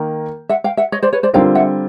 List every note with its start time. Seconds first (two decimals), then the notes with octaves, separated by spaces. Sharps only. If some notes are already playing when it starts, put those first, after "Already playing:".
Already playing: D#3 A#3
0.49 E5 F#5
0.64 F5 G5
0.77 E5 F#5
0.92 C#5 D#5
1.03 C5 D5
1.13 B4 C#5
1.23 C5 D5
1.34 D3 G3 C4 F4 A#4 F5 G5
1.55 E5 F#5